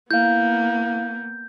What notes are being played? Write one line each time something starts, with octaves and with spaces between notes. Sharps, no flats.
A#3 B3 E4 F5 G6